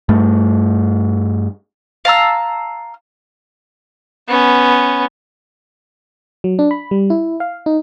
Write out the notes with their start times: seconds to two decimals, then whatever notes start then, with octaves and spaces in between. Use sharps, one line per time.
0.09 G2 A3
2.05 F5 A5 A#5 E6
4.28 B3 C#4
6.44 F#3
6.59 D4
6.71 B5
6.91 G3
7.10 E4
7.40 F5
7.66 D#4